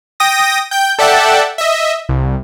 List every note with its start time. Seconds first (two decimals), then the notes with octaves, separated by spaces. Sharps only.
0.20 G5 D#6 A#6
0.71 G5 G6
0.99 A4 D5 E5 F#5 G5 A5
1.58 D#5 E5
2.09 C2